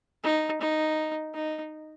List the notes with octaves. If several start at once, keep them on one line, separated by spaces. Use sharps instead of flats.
D#4
D#4
D#4